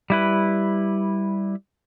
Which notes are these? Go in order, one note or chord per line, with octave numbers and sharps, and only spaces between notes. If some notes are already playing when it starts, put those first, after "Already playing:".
G3 E4 B4